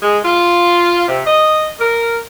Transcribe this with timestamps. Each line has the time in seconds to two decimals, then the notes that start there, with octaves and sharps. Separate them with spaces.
0.02 G#3
0.24 F4
1.08 C3
1.27 D#5
1.80 A#4